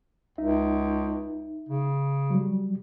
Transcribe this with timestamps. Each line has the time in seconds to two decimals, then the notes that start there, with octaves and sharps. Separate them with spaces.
0.38 C#2 D#4 E5
1.69 C#3
2.30 F#3 G3